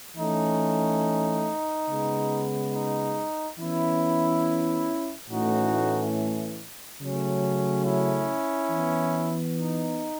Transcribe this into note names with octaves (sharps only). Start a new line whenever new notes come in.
E3 A3 C#4 D#4
C#3 G#3 B3
D#4
E3 B3 C#4 E4
A2 E3 A3 C#4 D#4 F#4
C#3 F#3 A3 C#4
C#4 E4
E3 B3
D#4